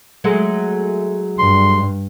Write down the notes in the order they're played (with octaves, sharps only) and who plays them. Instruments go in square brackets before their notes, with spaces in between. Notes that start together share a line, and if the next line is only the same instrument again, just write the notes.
[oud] F#3 G#3 A3
[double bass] G2 [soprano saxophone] C6